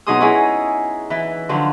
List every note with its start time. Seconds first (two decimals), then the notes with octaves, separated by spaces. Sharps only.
0.07 B2 F#3 D#4 G#4 C6 D#6
0.21 C#4 D#4 E4 G#4
1.10 E3 E4
1.49 D3 F3 F#3